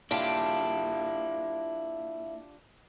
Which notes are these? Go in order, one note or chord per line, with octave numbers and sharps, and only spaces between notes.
A#3 D4 E4 F4 G4